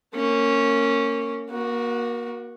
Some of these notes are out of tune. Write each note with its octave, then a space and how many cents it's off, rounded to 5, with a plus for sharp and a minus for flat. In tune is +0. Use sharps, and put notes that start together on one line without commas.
A#3 -20 C#4 -5
A#3 +30 F#4 -5